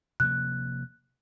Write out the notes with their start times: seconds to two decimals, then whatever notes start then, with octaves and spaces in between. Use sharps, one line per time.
0.20 C3 F3 A#3 F#6